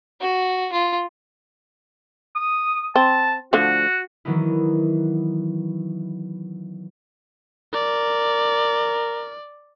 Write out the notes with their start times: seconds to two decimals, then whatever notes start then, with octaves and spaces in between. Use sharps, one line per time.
0.21 F#4
0.72 F4
2.36 D#6
2.96 C4 A5
3.53 D3 F3 A3 F#4
4.25 D#3 E3 F#3 B3 D#4 E4
7.74 A#4 D5